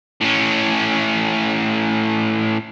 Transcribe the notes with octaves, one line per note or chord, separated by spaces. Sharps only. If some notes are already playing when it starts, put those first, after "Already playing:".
A2 C#4